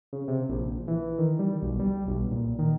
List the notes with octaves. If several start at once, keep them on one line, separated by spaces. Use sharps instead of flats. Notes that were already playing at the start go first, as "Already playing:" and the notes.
C#3
C3
A#1
A#1
E3
D#3
G3
B1
G3
B1
A#2
D#3